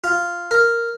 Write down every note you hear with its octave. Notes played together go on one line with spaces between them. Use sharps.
F4
A#4